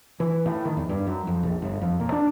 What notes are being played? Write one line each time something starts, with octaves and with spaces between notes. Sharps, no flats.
E3
A2
D#3
E2
G2
F#2
F2
A#1
G1
F2
A#2
D4